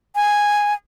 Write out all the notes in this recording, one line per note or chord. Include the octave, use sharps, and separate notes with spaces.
G#5